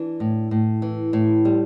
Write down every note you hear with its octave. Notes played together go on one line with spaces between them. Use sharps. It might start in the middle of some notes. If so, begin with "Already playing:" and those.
Already playing: E3 D4
A2
A2
E3
A2
G3